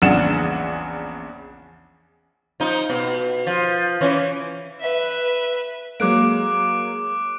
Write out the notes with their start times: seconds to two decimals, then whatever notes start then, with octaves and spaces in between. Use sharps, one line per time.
0.02 A#1 E2 C#3 D4 F#5 E7
2.60 F3 D#4
2.90 B2
3.47 F3
4.01 E3 C#4
4.80 B4 E5
6.00 F#3 G#3 A#3 D6 F#6 D7